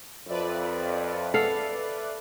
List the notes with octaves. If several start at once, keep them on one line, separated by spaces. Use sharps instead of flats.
F2 B4 D5 E5
A4 F5 F#5